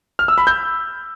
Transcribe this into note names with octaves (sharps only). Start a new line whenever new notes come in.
F6
E6
B5
G6